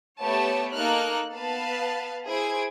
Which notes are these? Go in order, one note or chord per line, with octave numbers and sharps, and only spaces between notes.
A3 B3 G4 C#5 A5
A#3 D#4 A4 F6 F#6
B3 B4 F5 A5
E4 G#4 C5 G#6 D7